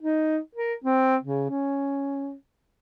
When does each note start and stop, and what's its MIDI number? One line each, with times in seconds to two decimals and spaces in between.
0.02 0.38 63
0.55 0.74 70
0.84 1.17 60
1.23 1.49 49
1.49 2.34 61